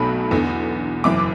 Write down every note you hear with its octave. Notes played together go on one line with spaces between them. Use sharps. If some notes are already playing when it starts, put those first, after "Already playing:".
Already playing: B1 B2 F#3 A3 B5
E2 D3 B3
F#1 F#2 E3 D6